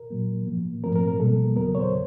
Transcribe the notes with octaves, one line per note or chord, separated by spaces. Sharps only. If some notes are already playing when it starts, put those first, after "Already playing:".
Already playing: A#4
A#2 F#3 A#3
A2 F3 A#3
G#2 F3 A3 C4 A#4
A#4
A#4
B2 G3 A#3 A4
E2 C#3 F#3 B3 A#4
C#5
C5